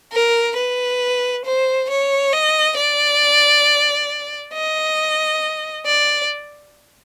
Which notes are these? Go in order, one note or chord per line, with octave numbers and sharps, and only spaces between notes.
A#4
B4
C5
C#5
D#5
D5
D#5
D5